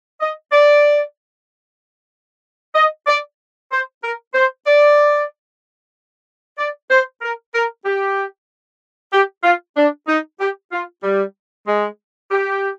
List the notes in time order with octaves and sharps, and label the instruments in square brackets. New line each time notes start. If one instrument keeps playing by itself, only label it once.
[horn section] D#5
D5
D#5
D5
C5
A#4
C5
D5
D5
C5
A#4
A#4
G4
G4
F4
D4
D#4
G4
F4
G3
G#3
G4